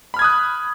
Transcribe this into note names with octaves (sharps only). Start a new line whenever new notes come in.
B5 D#6 F6 F#6 G#6